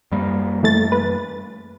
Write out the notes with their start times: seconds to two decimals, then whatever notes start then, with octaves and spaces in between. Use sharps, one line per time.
0.12 F#2 G3 A#3
0.63 E3 A3 A6
0.92 B4